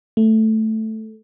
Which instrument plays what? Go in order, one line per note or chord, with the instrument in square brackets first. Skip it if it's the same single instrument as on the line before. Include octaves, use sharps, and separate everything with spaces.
[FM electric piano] A3